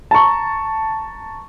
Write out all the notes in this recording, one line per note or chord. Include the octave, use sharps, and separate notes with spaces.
A5 A#5 C#6